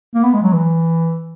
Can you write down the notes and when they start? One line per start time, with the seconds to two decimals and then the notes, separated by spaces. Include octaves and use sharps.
0.15 A#3
0.24 B3
0.34 G#3
0.42 F#3
0.53 E3